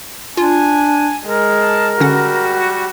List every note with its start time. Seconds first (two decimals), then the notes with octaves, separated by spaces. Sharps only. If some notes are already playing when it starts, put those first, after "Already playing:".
0.37 D4 F4 G#5
1.25 G#3 A#4
1.61 A5
2.00 D3 G3 C#4 F#4 F#5